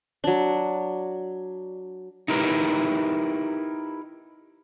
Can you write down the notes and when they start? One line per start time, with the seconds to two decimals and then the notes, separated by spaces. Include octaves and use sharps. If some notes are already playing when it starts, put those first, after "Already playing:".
0.24 F#3 D4
2.28 D#4 E4 G4 A#4 B4